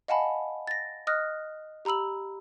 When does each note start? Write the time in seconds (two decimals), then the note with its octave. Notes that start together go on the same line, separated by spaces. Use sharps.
0.08 D#5 F5 F#5 G#5 A5 B5
0.67 A6 A#6
1.07 D#5 D#6 F6 F#6 A#6
1.85 G4 A#5 B5 E6 F#7